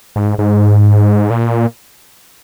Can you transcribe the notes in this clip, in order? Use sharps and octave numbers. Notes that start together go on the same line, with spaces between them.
G#2
G#2
A#2